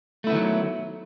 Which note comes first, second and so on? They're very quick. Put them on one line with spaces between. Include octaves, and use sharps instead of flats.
A3 E4 B3 D#3 F#3